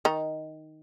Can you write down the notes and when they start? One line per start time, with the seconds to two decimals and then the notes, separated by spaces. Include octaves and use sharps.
0.05 D#3 D#4